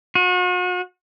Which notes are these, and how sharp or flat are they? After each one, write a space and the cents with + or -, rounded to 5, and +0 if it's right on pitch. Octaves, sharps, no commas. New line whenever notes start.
F#4 -40